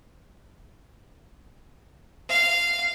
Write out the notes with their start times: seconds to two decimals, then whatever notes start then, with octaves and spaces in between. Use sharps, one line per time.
2.29 F5